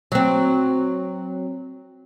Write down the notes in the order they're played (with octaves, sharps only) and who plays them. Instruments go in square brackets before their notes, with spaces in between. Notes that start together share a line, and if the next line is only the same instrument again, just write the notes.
[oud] F#3 C4